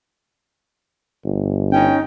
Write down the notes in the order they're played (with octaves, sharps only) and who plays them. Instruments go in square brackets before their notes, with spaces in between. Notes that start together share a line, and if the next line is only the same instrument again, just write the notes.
[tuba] G1
[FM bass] C#4 [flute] D#4 [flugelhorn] G5